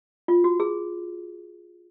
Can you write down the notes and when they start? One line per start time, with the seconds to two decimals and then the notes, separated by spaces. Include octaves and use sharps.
0.28 F4
0.44 F#4
0.60 G#4